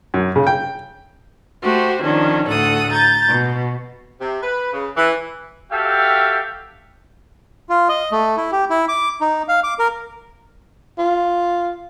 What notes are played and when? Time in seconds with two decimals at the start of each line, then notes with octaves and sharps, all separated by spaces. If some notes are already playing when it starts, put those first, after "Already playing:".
0.14 F#2
0.36 C#3
0.47 G5
1.62 A3 F#4 G4 C5
2.02 D#3 F3 C#4 D4
2.47 D2 A2 A4 F#5 D#6
2.92 A#5 G6 A6
3.27 B2
4.20 C3
4.42 B4
4.73 C#3
4.96 E3
5.72 F#4 G4 A4 E5 F5 G5
7.69 F4
7.89 D#5
8.12 A3
8.37 E4
8.52 G4
8.70 E4
8.89 D6
9.21 D#4
9.48 F5
9.64 D6
9.79 A#4
10.99 F4